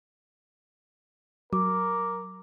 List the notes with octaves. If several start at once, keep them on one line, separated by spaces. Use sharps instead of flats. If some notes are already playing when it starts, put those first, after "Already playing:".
F#3 A#4 D6